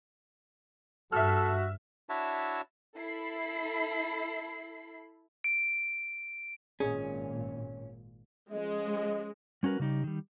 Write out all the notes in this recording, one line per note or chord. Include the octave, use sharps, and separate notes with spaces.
G2 F#4 A4 E5 F6
D4 E4 F#4 C#5 E5 A5
E4 A4 B5 C7
D7
G#1 A#2 C#4 G#4
F3 G#3 C#4 D#5
G3 C#4 F#4 A#4 B4
C#3 G3 D#4 G4
D#3 G3